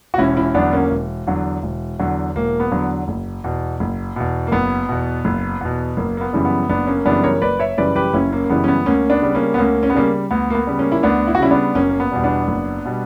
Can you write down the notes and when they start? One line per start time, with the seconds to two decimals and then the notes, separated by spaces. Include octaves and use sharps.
0.14 F#4
0.18 E1 C#4 E4
0.37 C#4 E4
0.54 E2 D3 F#3 B3 D4
0.73 A#3 C#4
0.91 E1
1.27 E2 D3 F#3
1.63 E1
1.99 E2 D3 F#3
2.36 E1 A#3
2.60 B3
2.72 E2 D3 F#3
3.08 F#1
3.44 E2 B2
3.80 F#1
4.16 E2 B2
4.47 A#3
4.52 F#1 B3
4.89 E2 B2
5.25 F#1
5.61 E2 B2
5.97 F#1 A#3
6.17 A#3
6.21 B3
6.33 F#2 C#3 E3 G3
6.45 B3
6.69 F#1 B3 D4
6.87 A#3 C#4
7.05 F#2 C#3 E3 G3 B3 D4
7.24 A#4 C#5
7.42 F#1 B4 D5
7.59 C#5 E5
7.77 F#2 C#3 E3 G3 B4 D5
7.95 G4 B4
8.13 F#1 C#4 E4
8.32 A#3 C#4
8.44 A#3
8.50 F#2 C#3 E3 G3 B3
8.64 C#4
8.68 B3
8.86 D2 A#3 C#4
9.10 B3 D4
9.22 C#3 G3
9.35 A#3 C#4
9.54 B3
9.58 D2 A#3 C#4
9.83 C#4
9.90 B3
9.95 C#3 G3 A#3 C#4
10.31 D2 B3
10.50 A#3
10.55 B3
10.67 C#3 G3
10.79 A#3 C#4
10.92 E4
11.03 D2 B3 D4
11.27 E4
11.35 F#4
11.39 C#3 G3 C#4 E4
11.51 B3 D4
11.75 F#1 A#3 C#4
11.89 A#3
12.00 B3
12.11 E2 B2 G3
12.24 B3 D4
12.48 F#1
12.85 B2 G3